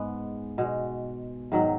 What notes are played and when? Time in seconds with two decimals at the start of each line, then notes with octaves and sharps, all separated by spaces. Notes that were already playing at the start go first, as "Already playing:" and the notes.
Already playing: G#2 G#3 B3
0.58 B2 G#3
1.52 G#2 D#3 F#3